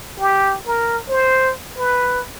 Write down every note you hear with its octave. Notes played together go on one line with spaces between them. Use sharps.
G4
A#4
C5
B4